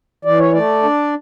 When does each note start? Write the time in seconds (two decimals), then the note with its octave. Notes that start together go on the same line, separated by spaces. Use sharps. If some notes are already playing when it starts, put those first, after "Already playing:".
0.25 E3 D5
0.38 C#5
0.53 A3 D5
0.83 D4